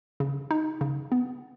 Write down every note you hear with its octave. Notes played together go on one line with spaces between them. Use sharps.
C#3
D#4
C#3
B3